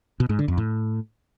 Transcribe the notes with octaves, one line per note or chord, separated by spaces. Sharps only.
B2
G#2
D3
F2
A2